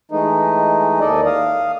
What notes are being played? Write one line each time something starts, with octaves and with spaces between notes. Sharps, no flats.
E3 G#3 A3 D#4
D#2 A4 D5 D#5
F5 D#6